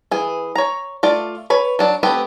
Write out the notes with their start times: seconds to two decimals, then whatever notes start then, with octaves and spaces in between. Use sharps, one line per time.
0.11 E3 G#4
0.55 C#5 A#5
1.03 A3 F4 D5
1.50 B4 C#5 B5
1.79 F#3 D4 D5
2.03 A3 B3 C4 G4 B4